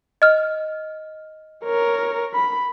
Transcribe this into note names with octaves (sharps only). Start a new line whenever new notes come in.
D#5 F6
A#4 C#5
B5